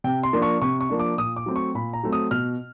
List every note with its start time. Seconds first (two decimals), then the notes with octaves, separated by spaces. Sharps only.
0.04 C3 G5
0.23 C6
0.33 F3 A#3 D4
0.42 C#6
0.62 C3 C#6
0.81 C#6
0.89 F3 A#3 D4
0.99 D6
1.18 A#2 D#6
1.36 D6
1.46 F#3 A3 C4
1.56 C#6
1.75 A#2 B5
1.93 A#5
2.03 F#3 A3 C4
2.13 D#6
2.31 B2 F6